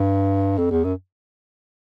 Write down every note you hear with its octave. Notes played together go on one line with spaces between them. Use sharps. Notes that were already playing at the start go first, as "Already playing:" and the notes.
Already playing: G2
F2
E2
F#2